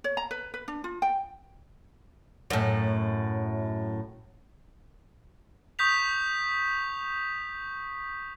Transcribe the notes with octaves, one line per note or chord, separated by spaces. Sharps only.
C#5
A#5
B4
B4
D4
F4
G5
F#2 A2
C#6 D#6 G6 B6 F7